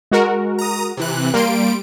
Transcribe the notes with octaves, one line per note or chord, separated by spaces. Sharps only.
G#3 F#4 A#4
A#5 D#6
C3 E3 F#6
G3 A#3 C6 D7